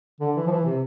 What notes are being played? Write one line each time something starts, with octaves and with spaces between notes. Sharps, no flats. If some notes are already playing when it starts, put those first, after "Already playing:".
D3
E3
F3
E3
C3